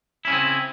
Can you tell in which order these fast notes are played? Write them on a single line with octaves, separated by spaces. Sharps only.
E4 C#4 C#3 C4